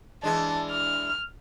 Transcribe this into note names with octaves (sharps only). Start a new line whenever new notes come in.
E3 G#3 D4 A5
F6